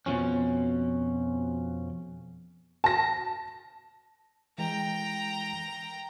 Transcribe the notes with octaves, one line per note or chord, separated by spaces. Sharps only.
F2 B2 D3 F3 C#4
A5 A#6
E3 G#3 G5 A#5